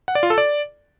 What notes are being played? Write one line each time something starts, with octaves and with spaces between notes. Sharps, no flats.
F#5
D5
F4
A4
D5